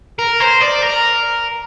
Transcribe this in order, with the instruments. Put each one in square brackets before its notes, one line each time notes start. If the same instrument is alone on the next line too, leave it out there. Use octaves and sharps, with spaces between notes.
[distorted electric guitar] A#4
C5
D5
A#4